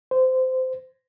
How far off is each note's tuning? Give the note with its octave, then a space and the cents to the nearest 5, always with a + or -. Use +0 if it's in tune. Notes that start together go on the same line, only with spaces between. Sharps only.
C5 -20